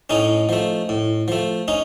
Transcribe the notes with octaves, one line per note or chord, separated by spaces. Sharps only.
A2 C#4 D#4
F3 A3
A2
F3 A3
C#4 D#4